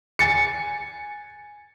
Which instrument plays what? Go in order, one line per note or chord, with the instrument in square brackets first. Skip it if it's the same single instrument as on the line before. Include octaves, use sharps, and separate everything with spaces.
[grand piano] G#5 A6 C#7